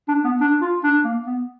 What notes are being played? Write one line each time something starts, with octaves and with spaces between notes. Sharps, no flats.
D4
B3
D4
F4
D4
A#3
B3